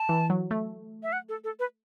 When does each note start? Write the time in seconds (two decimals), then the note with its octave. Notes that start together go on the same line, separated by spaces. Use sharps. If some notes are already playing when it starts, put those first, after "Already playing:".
Already playing: A5
0.09 E3
0.30 F#3
0.51 A3
1.03 E5
1.13 F#5
1.29 A4
1.44 A4
1.59 B4